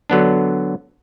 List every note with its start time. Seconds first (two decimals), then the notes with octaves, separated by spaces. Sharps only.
0.10 D3 F#3 B3 D4